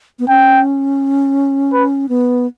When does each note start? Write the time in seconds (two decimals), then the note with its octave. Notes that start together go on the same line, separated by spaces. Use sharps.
0.19 B3
0.28 C#4 G5
1.73 B4
2.09 B3